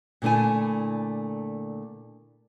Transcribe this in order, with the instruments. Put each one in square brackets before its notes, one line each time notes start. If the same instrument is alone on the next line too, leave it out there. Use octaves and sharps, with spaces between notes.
[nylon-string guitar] A#2 D3 A3 E4 G#5